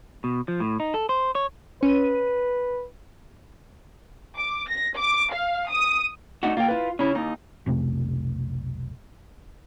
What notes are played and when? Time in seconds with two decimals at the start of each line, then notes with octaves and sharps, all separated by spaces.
0.24 B2
0.48 F3
0.60 A2
0.80 D#4
0.94 A4
1.09 C5
1.35 C#5
1.83 C#4 B4 D#7
4.38 D6
4.69 A#6
4.98 D6
5.33 F5
5.69 D#6
6.43 A3 D4 D#4 F#4
6.57 A#3 F4 G5
6.68 E4 B4
6.99 C#3 C#4 E4
7.15 D#2 D#4
7.66 B1 F2 C3 A3